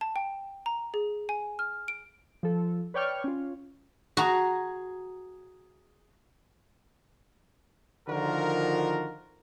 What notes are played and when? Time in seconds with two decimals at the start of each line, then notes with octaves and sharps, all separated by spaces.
0.01 A5
0.16 G5
0.66 A#5
0.94 G#4
1.29 G#5
1.59 F6
1.88 D7
2.43 F3 A4
2.94 B4 C#5 D5 G5 C#6 F6
3.24 C#4 F4
4.17 F#4 G#4 A#5
8.08 D3 D#3 F3 F4 F#4 A#4